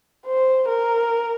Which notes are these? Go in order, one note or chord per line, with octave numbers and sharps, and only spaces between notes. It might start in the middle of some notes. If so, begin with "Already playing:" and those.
C5
A#4